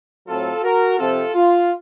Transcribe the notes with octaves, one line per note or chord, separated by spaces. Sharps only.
A2 F#3 C4 F4 A4
F#4 A#4
C3 F3 C4 F4 A4
F4